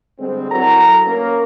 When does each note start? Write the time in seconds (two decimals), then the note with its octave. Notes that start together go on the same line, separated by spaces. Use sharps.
0.19 D3 G3 G#3 C4
0.51 F#3 E4 F#4 A4 A#4 A#5
1.06 A#3 C#4 A#4